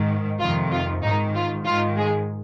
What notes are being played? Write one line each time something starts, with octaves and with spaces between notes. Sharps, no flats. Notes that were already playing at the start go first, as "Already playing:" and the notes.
Already playing: G#2 D#3
F2 C3 D#3 F4
F4
G#2 D#3 D#4
F4
G#2 D#3 F4
G#3 G#4